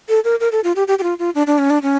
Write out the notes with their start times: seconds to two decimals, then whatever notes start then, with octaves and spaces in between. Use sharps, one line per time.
0.09 A4
0.24 A#4
0.40 A#4
0.52 A4
0.64 F4
0.76 G4
0.88 G4
0.99 G4
1.03 F4
1.19 F4
1.35 D4
1.47 D4
1.58 C#4
1.70 D4
1.82 C#4